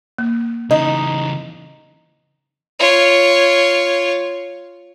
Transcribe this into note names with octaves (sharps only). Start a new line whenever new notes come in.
A#3
C#3 E3 D#4 D#5
F4 C#5